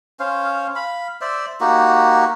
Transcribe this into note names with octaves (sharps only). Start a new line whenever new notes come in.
C#4 C5 F5
F5 B5
C5 D5 E5
A#3 D#4 F#4 G4